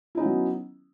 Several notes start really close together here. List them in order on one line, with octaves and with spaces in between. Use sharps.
E4 D#4 C#4 B3 F#3